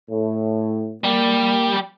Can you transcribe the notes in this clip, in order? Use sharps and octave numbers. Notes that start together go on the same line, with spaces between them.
A2
G3 A#3 G4